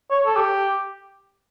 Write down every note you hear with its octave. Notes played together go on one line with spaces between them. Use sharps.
C#5
A4
G4